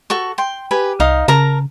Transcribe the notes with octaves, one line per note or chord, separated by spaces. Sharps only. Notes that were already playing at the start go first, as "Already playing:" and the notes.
F#4 A4 C#6
G5 C6
G4 B4 G#5
C2 D#4 F5 D#6
C#3 A#4 A5 A#5